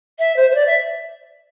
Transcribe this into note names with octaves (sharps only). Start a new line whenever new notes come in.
E5
C5
C5
D5
E5